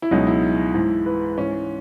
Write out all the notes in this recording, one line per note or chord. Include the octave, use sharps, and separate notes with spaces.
E4
C#2 B2 F#3 D#4
E4
G#2 E3
B4
G#2 E3 C#4